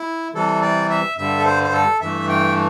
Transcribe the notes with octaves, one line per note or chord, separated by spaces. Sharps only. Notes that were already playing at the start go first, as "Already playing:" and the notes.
Already playing: E4
C3 E3 G3 A4
D5
E5
G2 D3 G3 E5
A4
C5
C5
A4
G2 E3 A3 E5
G5